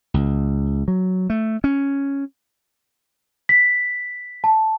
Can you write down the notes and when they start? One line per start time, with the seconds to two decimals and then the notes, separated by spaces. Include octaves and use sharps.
0.14 C#2
0.88 F#3
1.30 A3
1.64 C#4
3.49 B6
4.44 A5